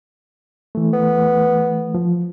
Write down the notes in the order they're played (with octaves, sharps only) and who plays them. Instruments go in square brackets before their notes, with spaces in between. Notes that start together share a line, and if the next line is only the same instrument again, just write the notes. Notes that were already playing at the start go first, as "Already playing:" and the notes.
[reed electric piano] E3 A3
[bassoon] B3
[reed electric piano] F3